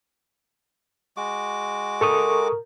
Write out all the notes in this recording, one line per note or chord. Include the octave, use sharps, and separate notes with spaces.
G#3 F#4 D6
A4 A#4 C#6 D#6